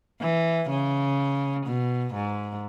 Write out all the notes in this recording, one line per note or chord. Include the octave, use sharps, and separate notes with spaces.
E3
C#3
B2
G#2